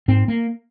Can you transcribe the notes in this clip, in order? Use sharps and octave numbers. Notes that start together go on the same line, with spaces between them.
G#2 C4
A#3